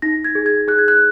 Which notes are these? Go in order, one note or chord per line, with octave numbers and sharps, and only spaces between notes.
D#4 A#6
G#6
G#4
G#6
G#4 F#6
G#6
F#6